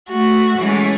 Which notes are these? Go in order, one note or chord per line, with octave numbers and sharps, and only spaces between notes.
A3 F#4
E3 G#3 A3 C#4